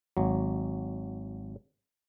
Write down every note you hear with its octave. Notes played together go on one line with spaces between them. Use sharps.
G#1 F#3